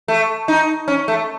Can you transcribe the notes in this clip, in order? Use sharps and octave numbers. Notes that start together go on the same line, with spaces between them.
A3
D#4
C#4
A3